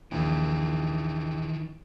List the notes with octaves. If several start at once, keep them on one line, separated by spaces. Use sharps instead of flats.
A#1 D#2 D#3 E3